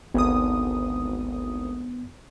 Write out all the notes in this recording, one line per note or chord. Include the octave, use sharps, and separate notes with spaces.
G#1 D2 B3 D#6